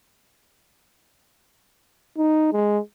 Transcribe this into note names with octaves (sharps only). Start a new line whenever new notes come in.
D#4
G#3